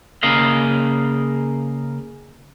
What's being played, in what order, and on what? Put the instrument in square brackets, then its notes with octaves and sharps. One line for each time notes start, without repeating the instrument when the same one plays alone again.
[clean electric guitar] C#3 A#3 A#4 D#5 F5